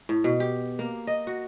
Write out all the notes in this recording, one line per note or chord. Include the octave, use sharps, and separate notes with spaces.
A2
B2
G4
A#3
D#5
F#4